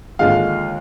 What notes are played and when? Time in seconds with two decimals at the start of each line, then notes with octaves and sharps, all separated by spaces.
0.19 D#2 D3 F3 G#3 F5